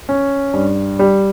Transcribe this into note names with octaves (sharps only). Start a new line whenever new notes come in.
C#4
G2
G3